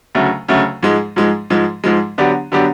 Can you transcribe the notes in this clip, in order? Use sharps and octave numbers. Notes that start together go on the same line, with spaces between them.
D2 C#3 F#3 A3
D2 C#3 F#3 A3
G#2 F3 G#3
G#2 F3 G#3
G#2 F3 G#3
G#2 F3 G#3
D3 F#3 B3 D4 G4
D3 F#3 B3 D4 G4